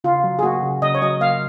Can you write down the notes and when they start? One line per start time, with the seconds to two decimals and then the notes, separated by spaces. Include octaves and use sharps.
0.04 C#3 F4
0.24 F#3
0.39 G#4
0.43 A#3 F#4
0.62 C#3
0.82 C#3 D#5
0.95 C#5
1.02 F#3 D#5
1.21 A#3 F5